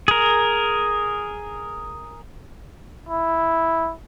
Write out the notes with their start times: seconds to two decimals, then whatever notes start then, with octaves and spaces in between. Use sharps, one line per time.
0.08 G#4 A#4
3.09 E4